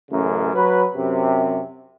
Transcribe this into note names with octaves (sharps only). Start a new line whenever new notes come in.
A1 F#2 C#3
F#3 B4
F#2 C3